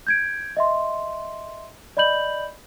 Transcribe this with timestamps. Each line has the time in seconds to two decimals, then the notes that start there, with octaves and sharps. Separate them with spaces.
0.07 G6 G#6 D7
0.57 D#5 E5 C6
1.97 D5 D#5 B5 G6 F#7